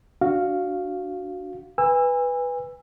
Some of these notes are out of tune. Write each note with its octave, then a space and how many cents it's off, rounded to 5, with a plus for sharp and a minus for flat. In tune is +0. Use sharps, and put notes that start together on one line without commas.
D4 +0 F#4 +0 F5 +0
B4 +0 G#5 -35 E6 +10